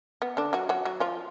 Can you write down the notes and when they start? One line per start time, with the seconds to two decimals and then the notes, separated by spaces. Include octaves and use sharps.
0.22 B3
0.37 D3 D4
0.53 F#3 F#4
0.69 F#3 F#4
0.85 F#3 F#4
1.00 F3 F4